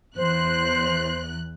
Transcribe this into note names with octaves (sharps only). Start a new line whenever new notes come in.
E2 C5 F#6